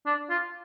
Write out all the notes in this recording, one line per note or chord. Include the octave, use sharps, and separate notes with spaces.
D4
F4